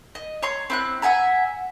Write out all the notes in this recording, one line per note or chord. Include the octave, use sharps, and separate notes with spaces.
D#5
C#5 A#5 C6
C4 E4 F#6
E5 F#5 G#5 A#5